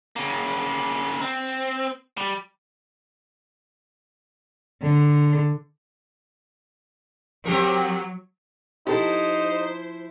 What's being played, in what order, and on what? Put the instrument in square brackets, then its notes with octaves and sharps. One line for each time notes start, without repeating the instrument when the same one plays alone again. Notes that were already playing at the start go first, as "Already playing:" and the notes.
[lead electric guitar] C#3 A#3
C4
G3
[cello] D3
[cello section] F#3 [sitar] C4 G4 A#4
[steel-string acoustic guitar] F3 E4 [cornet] D#4 [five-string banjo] G4 A4 [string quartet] C5